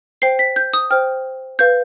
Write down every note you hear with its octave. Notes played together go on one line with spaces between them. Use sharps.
C5 G5 C7
B6
G6
D#6
C5 G5 F6
B4 F5 G6